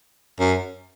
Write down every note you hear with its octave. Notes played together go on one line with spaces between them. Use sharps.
F#2